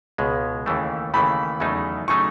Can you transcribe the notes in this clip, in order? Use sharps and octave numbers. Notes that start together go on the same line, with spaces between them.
C#2 B2 G#3
D#2 C#3 E3 A3
D#2 C#3 E3 A3 B5
E2 C#3 F#3 A3 D#4
C#3 F#3 A3 D#4 C#6